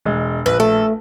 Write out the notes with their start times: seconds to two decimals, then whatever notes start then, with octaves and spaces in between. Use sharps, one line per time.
0.05 E1 G#3
0.46 A#1 B4
0.60 A3 A4